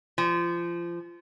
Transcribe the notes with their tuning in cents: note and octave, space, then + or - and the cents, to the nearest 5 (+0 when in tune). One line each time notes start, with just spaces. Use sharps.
F3 -25